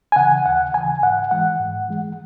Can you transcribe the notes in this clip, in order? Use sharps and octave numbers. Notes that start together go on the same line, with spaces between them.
G#5
C#3 E3 F#5
D#2 F#5
C#3 E3 G#5
G#2 F#5
E3 G#3 F#5
G#2
E3 G#3